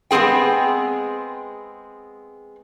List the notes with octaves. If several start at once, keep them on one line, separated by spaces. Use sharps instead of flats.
G#3 B3 C4 G#4 G5